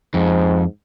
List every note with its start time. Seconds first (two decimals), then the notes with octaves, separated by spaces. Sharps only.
0.14 F2 G#2